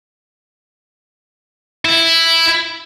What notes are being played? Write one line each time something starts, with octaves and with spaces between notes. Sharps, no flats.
E4